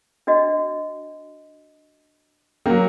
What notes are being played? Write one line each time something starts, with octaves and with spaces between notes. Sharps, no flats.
D4 F#4 D#5
F#3 A#3 C#4